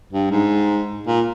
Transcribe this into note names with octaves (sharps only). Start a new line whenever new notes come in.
G2
G#2
A#2